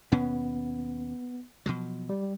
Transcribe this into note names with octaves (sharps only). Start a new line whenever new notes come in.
D#2 B2 B3 C#4
B2 F3 F#3
G3